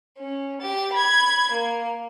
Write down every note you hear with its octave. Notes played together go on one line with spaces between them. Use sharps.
C#4
G4 A6
B5 G#6
A#3